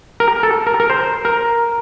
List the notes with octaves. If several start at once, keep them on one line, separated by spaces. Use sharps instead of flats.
A#4
A4
A#4
A#4
C5
A#4